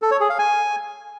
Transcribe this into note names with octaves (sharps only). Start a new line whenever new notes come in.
A4
C#5
G#4
F5
G#5